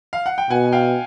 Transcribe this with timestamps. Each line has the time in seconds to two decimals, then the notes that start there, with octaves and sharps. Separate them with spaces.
0.13 F5
0.26 F#5
0.38 G5
0.50 B2 F#5 G#5
0.72 F5 G5